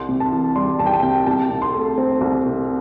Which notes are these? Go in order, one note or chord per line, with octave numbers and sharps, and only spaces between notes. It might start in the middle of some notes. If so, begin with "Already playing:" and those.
Already playing: C2 C6
C3
A5
E3
G3 C6
C2 A5
G5
A5
C3 G5
C2 A5
C3
C6
A3
C4
C2
C3